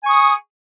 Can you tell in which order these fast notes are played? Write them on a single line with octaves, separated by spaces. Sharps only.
G#5 C#6 D#6